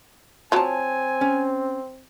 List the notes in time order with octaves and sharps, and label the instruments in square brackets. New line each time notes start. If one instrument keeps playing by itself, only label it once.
[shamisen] F3 F#3 [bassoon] C4 [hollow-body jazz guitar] C#5 A5 [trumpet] G#5
[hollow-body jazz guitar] C#4